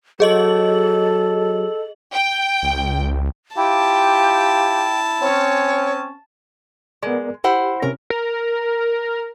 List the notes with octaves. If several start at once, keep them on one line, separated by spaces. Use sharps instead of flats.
F#3 G#4 A4 D#5 F#7
G5
C#2
E4 F4 G4 G5 A5
C4 C#4 C#5
G#3 B3 A#4 D5
E4 G4 C5 F#5
C3 C#4 A#4
A#4